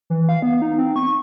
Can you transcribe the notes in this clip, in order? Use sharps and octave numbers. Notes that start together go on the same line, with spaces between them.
E3
F5
B3
D#4
C4
C#6